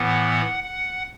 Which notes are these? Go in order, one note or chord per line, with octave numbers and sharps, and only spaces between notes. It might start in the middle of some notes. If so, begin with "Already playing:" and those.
Already playing: A2 E3 B3 F#5
F#5